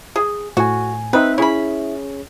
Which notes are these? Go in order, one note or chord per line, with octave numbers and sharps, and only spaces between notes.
G#4
A2 F#4 G#5
C4 D#4 B4 E5
C#4 E4 G#4 C#5 B5